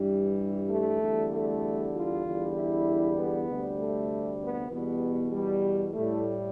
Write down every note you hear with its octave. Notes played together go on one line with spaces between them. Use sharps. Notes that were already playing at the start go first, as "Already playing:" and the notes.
Already playing: G2 E3 G3
A3
E2 D3 G3
A3
F4
E2 D3 G3
E4
B3
D2 C3 G3
A3
B3
E2 B2 G3 B3
G3
A2 G3 A3